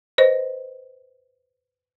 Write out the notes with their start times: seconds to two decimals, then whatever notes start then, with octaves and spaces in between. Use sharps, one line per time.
0.18 B4 C5 D#5